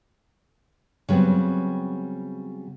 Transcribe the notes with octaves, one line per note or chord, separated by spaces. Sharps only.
C#3 F#3 G3 B3 C4